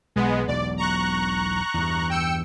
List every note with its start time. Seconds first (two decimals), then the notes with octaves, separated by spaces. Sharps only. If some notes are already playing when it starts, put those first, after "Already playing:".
0.16 B1 G#3 B3
0.48 E1 B1 F#3 D5
0.77 A#5 C#6 F#6
1.74 E2 G2
2.10 G5 E6 C#7